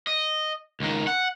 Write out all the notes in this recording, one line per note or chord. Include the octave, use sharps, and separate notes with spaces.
D#5
C#2 D#3
F#5